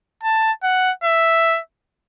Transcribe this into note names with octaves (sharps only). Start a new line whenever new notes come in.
A5
F#5
E5